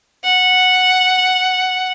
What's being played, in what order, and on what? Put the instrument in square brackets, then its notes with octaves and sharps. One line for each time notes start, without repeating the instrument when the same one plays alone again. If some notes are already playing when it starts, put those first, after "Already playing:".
[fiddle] F#5